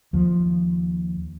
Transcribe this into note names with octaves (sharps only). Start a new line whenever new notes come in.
D#2 F3